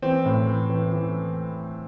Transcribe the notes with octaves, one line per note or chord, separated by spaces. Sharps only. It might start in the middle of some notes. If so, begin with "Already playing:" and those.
E3 C4
A2
E3
E3
E3